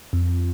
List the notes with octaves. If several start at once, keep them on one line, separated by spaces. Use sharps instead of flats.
F2